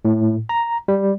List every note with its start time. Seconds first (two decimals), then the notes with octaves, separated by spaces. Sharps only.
0.05 A2
0.49 A#5
0.88 G3